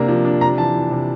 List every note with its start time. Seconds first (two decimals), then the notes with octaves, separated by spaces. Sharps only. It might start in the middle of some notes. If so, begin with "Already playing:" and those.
Already playing: C3 A#3 D4 A#5
0.08 F3
0.25 D4
0.41 C3 A#5
0.58 E3 A5
0.74 E3
0.91 C3